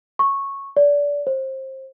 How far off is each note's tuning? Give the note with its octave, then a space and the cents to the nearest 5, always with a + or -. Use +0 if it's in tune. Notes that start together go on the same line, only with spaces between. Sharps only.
C#6 -10
D5 -25
C5 +25